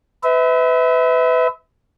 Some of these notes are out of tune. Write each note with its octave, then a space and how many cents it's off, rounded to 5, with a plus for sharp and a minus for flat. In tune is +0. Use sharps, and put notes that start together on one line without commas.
B4 +30 E5 -30